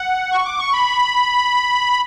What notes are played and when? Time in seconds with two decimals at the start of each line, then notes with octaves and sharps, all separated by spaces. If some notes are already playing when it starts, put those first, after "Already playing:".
Already playing: F#5
0.32 C#6
0.46 D6
0.59 C#6
0.73 B5